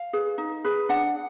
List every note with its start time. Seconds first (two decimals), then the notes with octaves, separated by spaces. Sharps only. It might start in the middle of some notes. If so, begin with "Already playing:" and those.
Already playing: F5
0.13 G#4 B4
0.38 D#4
0.65 G#4 B4
0.89 D4 F#5